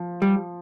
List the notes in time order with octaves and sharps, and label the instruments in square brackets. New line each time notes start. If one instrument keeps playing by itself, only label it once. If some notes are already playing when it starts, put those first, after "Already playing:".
Already playing: [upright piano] F3
[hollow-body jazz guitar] G3